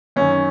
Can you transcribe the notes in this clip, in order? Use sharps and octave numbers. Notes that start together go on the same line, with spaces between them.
F#2 D#3 C#4